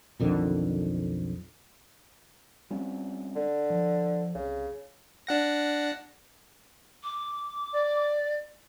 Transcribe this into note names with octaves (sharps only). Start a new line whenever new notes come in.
B1 F2 D3 D#3
G3 C4 C#4
D3
F3
C2 C#3
D4 F#5 A#6
D6
D5